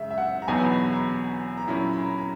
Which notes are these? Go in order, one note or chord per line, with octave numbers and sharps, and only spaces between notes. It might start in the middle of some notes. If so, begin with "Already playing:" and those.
Already playing: F#2 C#3 G#3 E5
E5
F#5
A#5
E2 B2 F#3 B3 D#4 G#5
B5
B5
A#5
A#5
A#2 F#3 C#4 E4 B5
B5
A#5
A#5